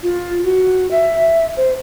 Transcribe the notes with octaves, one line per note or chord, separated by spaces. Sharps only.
F4
F#4
E5
C5